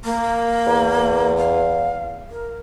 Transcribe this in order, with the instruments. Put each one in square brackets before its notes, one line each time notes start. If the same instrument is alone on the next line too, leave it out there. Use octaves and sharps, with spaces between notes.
[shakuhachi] A#3
[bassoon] E2
[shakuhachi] F5
A#4